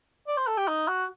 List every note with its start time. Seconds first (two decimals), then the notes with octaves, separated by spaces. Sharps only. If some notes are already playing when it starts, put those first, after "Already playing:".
0.28 D5
0.37 C5
0.47 A4
0.57 G4
0.68 D#4
0.88 F#4